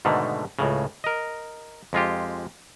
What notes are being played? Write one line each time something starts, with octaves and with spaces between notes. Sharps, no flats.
G#2 B2 D3 D#3 A3
C#2 A2 C#3
A#4 D#5
F2 G#3 F4 G4